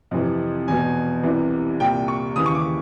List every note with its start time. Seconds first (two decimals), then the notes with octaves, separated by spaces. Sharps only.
0.11 F2 C3 E3
0.68 E2 B2 G#5
1.23 C2 C3 E3
1.80 C2 A#2 G5
2.08 C#6
2.36 D#2 C#3 E3 D#6
2.46 C#6
2.55 D6